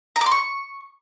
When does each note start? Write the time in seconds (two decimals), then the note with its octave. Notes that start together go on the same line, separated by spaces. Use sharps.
0.16 A#5
0.21 D6
0.26 C6
0.31 C#6